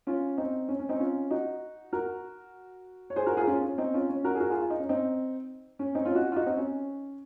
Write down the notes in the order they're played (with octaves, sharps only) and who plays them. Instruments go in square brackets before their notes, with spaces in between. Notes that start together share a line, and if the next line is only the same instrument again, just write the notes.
[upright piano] C#4 F4
C4 D#4
C#4
C#4
C4 D#4
C#4 F4
D#4 F#4
F#4 A#4
C#5
G#4 C5
F#4 A#4
F4 G#4
C#4 F4
C#4
C4 D#4
C#4 F4
C#4
F#4 A#4
G#4
F#4 A#4
F4 G#4
F4
D#4
C#4
C4 D#4
C#4
C4 D#4
C#4 F4
D#4 F#4
F4
D#4 F#4
C4 D#4
C#4